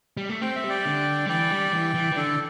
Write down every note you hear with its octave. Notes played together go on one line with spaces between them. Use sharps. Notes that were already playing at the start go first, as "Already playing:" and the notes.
G3
A3
C4 G5
E5
G3
D5 G5
D3
G3
E3 D5 G5
G3
E3
E3
E3
D3 A4 D5